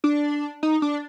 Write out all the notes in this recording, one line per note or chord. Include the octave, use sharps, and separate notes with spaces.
D4
D#4
D4